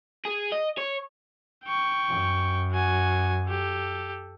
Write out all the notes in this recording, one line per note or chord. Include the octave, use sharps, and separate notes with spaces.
G#4
D#5
C#5
G5 C#6
F#2
F#4 G#5
G4 A4